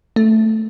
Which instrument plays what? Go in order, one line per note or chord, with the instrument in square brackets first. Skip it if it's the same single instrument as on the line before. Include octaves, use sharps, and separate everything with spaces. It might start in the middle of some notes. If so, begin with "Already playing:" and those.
[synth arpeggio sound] A3